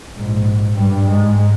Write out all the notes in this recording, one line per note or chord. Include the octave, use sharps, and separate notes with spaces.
A#1 G#2
G2 G3
G#2 G#3